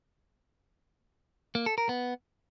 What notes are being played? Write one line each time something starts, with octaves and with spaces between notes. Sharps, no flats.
A#3
A4
A#4
B3